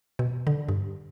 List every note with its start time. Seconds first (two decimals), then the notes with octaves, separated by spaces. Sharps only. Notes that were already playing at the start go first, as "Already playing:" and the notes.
0.19 B2
0.47 D3
0.69 G2